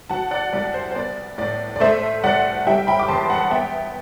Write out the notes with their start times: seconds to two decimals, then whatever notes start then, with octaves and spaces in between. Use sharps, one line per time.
0.10 F#3 F#5 A5
0.31 D5 F#5
0.53 C2 D5
0.74 C5
0.91 C5
0.95 B3 D5
1.38 A2 D5
1.76 D5
1.80 A3 C5 E5
2.24 C2 D5 F#5
2.67 G3 E5 G5
2.87 G5 B5
3.00 D6
3.08 E2 A5 C6
3.30 F#5 A5
3.51 B3 E5 G5